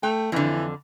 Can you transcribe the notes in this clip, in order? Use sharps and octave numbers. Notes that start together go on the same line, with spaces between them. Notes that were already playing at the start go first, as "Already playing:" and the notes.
A3 G5
F2 D3 E3